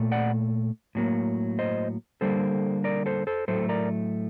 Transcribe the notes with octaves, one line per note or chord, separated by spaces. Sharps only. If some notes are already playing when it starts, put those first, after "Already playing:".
Already playing: A#2 A3
D5 F#5
A2 F#3 A#3
C5 D#5
D3 G3 A#3 A4 C5
A#4 D5
A4 C5
A4 C5
A2 F#3 A3 A4 C5
A#4 D5